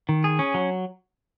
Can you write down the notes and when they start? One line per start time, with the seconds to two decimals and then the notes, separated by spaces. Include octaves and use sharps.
0.09 D#3
0.24 G#4
0.39 C#4
0.54 F#3